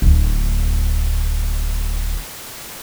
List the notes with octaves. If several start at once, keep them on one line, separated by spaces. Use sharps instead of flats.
D1 D2